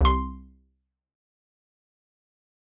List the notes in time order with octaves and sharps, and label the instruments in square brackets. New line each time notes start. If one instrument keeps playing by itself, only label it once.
[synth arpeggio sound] C2 C6